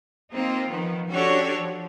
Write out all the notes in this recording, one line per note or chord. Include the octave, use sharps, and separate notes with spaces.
A#3 C4 D#4 F4
D#3 F3 B3
C#4 D4 F#4 G4 A4 C#5
F3